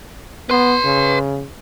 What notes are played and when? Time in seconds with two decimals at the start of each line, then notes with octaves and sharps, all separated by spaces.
0.50 B3 B4 C6
0.84 C#3